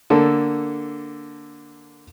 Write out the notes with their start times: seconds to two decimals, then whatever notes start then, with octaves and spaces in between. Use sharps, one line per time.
0.10 D3 A#3 A4